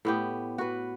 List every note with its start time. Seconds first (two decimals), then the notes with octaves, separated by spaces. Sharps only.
0.05 A2 B3 G4
0.58 F#4 B4